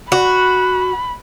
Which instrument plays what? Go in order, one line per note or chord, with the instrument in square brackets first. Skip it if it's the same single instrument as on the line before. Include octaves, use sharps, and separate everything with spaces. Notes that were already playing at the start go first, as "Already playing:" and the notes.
[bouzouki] F#4 [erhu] B5